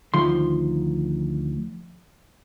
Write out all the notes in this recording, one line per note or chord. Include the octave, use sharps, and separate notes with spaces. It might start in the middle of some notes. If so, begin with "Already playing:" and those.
D2 D#3 F3 C6